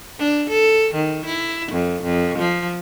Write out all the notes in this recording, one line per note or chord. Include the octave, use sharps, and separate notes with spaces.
D4
A4
D#3
E4
F2
F2
F3